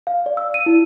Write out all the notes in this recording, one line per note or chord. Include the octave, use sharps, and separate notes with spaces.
F5
D5
E6
D#7
E4